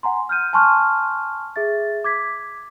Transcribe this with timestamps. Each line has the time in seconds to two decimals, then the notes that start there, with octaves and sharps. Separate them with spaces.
0.03 F#5 G#5 A#5 C6
0.29 F6 G6 D#7
0.53 G#5 A5 C6 C#6 F6 F#6
1.56 G#4 E5 A6
2.04 D6 G#6 B6